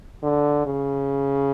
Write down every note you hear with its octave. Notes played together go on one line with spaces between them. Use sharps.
D3
C#3